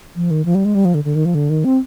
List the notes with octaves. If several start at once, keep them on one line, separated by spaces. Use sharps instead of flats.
F3
D#3
F3
G3
G#3
G3
F3
D3
D3
D#3
F3
D3
D#3
C4